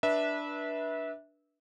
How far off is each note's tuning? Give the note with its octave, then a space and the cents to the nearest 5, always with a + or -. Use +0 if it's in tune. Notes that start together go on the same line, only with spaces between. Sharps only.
D4 +0 B4 -25 E5 -20